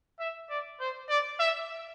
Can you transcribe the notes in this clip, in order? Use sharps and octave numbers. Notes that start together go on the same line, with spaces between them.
E5
D5
C5
D5
E5